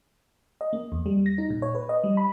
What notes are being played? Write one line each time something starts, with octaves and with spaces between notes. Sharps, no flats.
D#5
A#3
E2
G3
A#6
D#4
A#2
C#5
B4
D#5
G3
B5